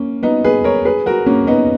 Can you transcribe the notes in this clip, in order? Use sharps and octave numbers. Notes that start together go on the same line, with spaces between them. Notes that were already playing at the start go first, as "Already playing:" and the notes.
Already playing: A#3 C#4
B3 D#4
G#4 B4
A#4 C#5
G#4 B4
F#4 A#4
A#3 C#4
B3 D#4